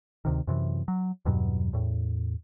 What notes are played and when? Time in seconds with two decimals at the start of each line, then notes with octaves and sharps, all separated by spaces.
0.25 D2 C3 D#3
0.47 F#2 C3 E3
0.88 F#3
1.25 E2 G2 B2 F#3
1.73 E2 A2